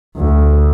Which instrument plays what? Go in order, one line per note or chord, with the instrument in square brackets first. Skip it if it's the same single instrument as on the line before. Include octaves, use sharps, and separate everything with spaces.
[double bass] D2